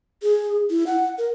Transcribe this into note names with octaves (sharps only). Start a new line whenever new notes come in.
G#4
E4
F#5
A#4